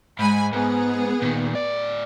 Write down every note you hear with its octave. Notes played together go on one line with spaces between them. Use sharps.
G#2 G#3 G#5 B5
G#2 B3 G#4
A#2 D#3
A2 D5